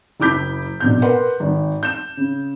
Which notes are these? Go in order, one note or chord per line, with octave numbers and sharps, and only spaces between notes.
F#1 E4 D6 G6 B6
A#1 B2 G6
A#4 B4 F#5 C6
G#1
G6 E7
C#3